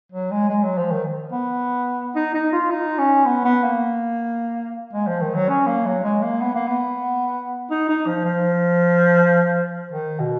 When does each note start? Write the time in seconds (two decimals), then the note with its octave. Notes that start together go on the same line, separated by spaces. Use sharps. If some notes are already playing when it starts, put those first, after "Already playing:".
0.12 F#3
0.31 G#3
0.49 G#3
0.63 F#3
0.78 F3
0.91 D#3
1.32 B3
2.15 D#4
2.34 D#4
2.52 F4
2.70 D#4
2.98 C#4
3.26 B3
3.45 B3
3.64 A#3
4.93 G#3
5.07 F3
5.21 D#3
5.35 F#3
5.49 C#4
5.67 A#3
5.86 F#3
6.04 G#3
6.22 A#3
6.41 B3
6.55 A#3
6.67 B3
7.70 D#4
7.89 D#4
8.06 F3
8.25 F3
9.92 D#3
10.20 B2